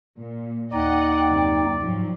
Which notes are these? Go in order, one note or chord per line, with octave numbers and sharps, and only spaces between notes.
A#2
D#2 D#4 D5 D#5 F#5 G5
F#2 C3
G#2 F3 F#3